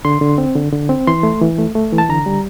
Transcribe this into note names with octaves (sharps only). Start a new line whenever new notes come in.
D3 C6
D3
C4
D3
D3
C4
E3 C6
A3
E3
A3
A3
E3
A5
D3 A#5
G3